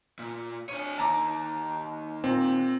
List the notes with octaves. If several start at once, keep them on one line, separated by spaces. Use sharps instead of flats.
A#2
D4 C#5 D#7
D#2 A5 A#5 D6
A#2 C4